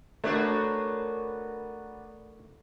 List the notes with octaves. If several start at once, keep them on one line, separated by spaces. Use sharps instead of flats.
A3 B3 D4 F#4 A#4 B4 C#5